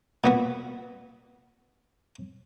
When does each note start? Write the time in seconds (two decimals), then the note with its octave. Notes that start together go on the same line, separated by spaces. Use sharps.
0.24 A#2 B3 F#4